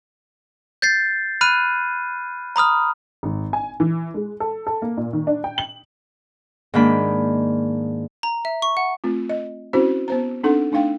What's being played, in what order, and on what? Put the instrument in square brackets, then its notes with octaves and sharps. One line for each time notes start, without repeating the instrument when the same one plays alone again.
[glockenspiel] G6 A6 C7
B5 F6 F#6 D#7
A#5 B5 D#6 F6
[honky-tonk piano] G#1
G#5
E3
G#3
A4
A4
A#3
A#2
D#3
D4
G5
F#7
[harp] G#2 D#3 A#3 D4 B5
[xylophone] A#5
E5
C#6
F#5
[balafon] A3 C4 F4
D#5
C4 C#4 E4 F#4 C5
B3 C5 A#5
C4 D4 D#4 A4 F#5
A3 D4 D#4 F5 G5